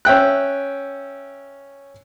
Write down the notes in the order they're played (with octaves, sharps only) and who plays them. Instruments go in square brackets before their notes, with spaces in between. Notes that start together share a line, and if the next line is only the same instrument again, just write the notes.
[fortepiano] C#4 E5 G5 F#6